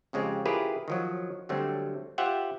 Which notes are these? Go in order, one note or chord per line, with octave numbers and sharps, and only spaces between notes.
F2 C#3 G#3 C4 G4
E4 F4 G4 G#4 A#4 B4
D#3 F3 F#3
D3 F#3 G3 A3 C4
F4 G4 C5 E5 F#5 G5